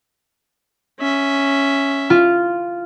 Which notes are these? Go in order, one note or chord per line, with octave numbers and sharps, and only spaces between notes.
C#4 E5
F4